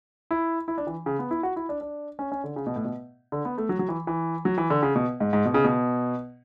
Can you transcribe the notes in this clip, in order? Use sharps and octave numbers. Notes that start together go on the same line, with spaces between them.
E4
E4
D4
E3
C#3
B3
E4
F#4
E4
D4
D4
C#4
C#4
D3
C#3
B2
A2
B2
D3
B3
A3
F#3
F#3
E3
E3
F#3
E3
D3
C#3
B2
G#2
G#2
B2
C#3
B2